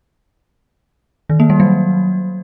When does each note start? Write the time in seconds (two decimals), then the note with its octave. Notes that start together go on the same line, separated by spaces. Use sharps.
1.30 D#3
1.40 A#3
1.50 G3
1.60 F#3